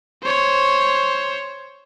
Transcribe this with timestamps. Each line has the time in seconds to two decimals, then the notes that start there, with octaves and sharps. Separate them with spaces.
0.23 C5 C#5